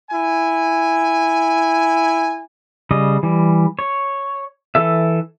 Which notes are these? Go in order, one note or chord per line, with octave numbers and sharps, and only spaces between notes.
E4 G#5
C#3 G3 D#5
E3 G3
C#5
E3 A4 E5